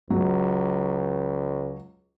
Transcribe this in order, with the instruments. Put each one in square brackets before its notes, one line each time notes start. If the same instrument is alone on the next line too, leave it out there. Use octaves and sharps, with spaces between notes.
[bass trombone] C#2 [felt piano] F#3